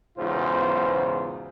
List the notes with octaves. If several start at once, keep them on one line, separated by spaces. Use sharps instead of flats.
B1 E2 G#2 C#3 F4 C5